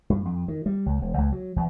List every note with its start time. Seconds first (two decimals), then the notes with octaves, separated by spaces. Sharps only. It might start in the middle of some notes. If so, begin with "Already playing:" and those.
0.10 G2
0.25 F2
0.48 D#3
0.66 G3
0.86 C#2
1.02 E1
1.18 C#2
1.32 F#3
1.56 E2